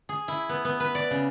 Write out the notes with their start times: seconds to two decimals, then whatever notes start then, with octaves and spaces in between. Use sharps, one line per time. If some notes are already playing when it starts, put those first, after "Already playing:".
0.09 G#4
0.28 E4
0.49 B3
0.65 B3
0.80 B4
0.95 D5
1.11 C#3